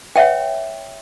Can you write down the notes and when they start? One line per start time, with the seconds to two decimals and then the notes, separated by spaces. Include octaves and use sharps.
0.16 B4 C#5 E5 F#5 G5